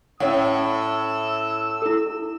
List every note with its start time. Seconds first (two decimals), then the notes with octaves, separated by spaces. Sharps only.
0.20 A2 C#4 C#5 F#5 E6
1.82 E4 A4